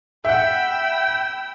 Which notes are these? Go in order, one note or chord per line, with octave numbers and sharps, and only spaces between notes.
E5 F#5 G5 B5 E6